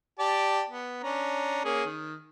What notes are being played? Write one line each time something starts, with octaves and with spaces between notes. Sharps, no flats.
G4 D5 A5
B3
C#4 D4 A#5
A#3 C#4 G#4
D#3